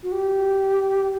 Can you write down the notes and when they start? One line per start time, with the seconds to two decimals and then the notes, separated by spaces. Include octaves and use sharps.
0.03 F#4
0.12 G4